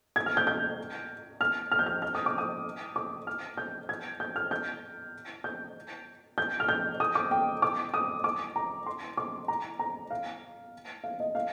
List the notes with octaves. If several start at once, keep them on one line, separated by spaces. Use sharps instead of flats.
G#6
F6
G6
G6
F6
F6
G6
F6
F6
D#6
D6
D#6
D6
F6
G6
G#6
G6
F6
G6
G6
G6
F6
G6
D#6
D6
G5
D6
D#6
D6
A#5
C6
D6
A#5
A#5
F5
F5
D#5
F5